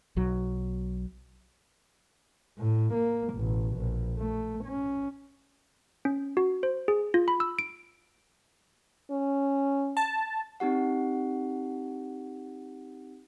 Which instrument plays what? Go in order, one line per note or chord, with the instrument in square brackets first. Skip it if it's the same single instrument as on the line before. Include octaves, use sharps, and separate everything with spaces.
[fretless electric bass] B1 F#3
[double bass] A2
A#3
A1 B2
A#1
A3
C#4
[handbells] C#4
F#4
C5
G#4
F4
B5
E6
D7
[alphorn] C#4
[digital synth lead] A5
[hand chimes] C4 D#4 G4 F#5